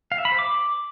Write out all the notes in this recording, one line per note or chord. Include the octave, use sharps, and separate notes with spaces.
F5
E5
B5
C5
D6